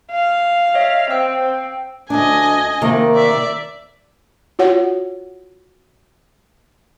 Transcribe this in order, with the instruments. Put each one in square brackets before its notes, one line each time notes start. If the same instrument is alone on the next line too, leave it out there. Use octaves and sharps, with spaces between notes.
[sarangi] F5
[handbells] C#5 D#5 E5
[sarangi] C4 [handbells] G5 E6
[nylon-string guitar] D2 D4 [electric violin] D#5 G#5
[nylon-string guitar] C3 D#3 A#3
[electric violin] D5 E5
[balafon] F4 F#4 C#5 F#5